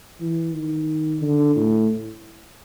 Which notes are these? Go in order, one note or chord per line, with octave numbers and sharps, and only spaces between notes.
E3
D#3
D3
A2